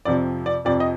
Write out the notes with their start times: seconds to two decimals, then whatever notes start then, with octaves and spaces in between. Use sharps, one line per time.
0.05 F2 C3 F3 D5
0.46 D5
0.65 F2 C3 F3 D5
0.80 D#5